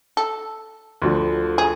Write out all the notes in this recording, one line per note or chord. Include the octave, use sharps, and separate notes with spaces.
A4
D2 D3 F3
G#4